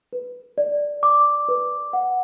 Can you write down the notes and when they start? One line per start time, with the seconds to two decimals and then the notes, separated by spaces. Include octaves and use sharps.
0.13 B4
0.58 D5
1.03 D6
1.48 B4
1.93 F#5